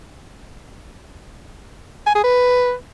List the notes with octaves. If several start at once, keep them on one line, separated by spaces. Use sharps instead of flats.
G#5
G#4
B4